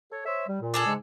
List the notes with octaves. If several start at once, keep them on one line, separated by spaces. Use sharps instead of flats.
A4 C#5
C5 C#5 E5
G3
A#2
D4 G#4 A4
G#2 C#3 G#3